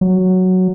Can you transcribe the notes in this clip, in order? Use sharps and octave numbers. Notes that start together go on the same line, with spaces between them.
F#3